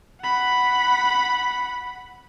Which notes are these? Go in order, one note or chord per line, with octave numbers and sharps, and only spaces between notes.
F#5 B5